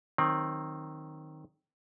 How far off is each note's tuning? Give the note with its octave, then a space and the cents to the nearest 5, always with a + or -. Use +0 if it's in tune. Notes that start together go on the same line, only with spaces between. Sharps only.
D#3 +0 F#3 +5 C4 +15